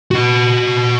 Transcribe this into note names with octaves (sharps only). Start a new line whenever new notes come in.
F#4 D#5